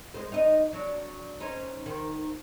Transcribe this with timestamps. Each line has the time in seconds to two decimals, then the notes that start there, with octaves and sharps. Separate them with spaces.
0.14 G#3 C5
0.32 D#4 D#5
0.73 F#3 D4
1.40 C#4 D#4 C5
1.86 D#3 C5